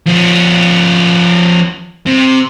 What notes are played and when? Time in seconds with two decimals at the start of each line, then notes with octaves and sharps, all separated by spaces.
0.06 F3 C#4
2.06 C3